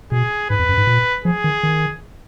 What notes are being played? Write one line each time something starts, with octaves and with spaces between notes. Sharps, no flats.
B2 G#4
G#2 B4
F2
F#2
G#2
A#2
F3 G#4
D#3
D#3